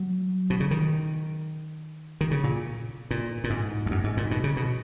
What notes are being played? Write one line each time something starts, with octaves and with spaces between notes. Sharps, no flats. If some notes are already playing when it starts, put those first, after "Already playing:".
Already playing: F#3
B2
C#3
D#3
D#3
C#3
A#2
A#2
A#2
G#2
E2
F#2
G#2
A#2
B2
C#3
B2